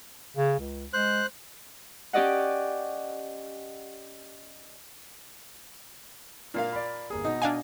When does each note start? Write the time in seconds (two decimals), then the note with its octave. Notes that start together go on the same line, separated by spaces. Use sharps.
0.37 C#3
0.60 C#2
0.93 G#3 C5 F#6
2.13 C#4 G4 D5 D#5 F#5
6.54 A#2 A#3 F5
6.73 D5 B5
7.10 G1 A#3 G#4
7.24 B2 D#4
7.42 D4 F5 G#5